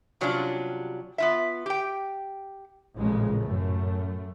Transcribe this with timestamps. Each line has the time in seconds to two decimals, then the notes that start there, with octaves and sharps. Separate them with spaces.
0.21 C3 F#3 G3 C#4 D4 F4
1.18 B3 F4 E5
1.66 G4 G5
2.96 A1 F2 A#2 C#3 G#3
3.42 F#2 A3